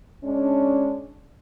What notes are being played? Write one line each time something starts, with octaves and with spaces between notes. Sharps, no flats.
G#3 C#4 D4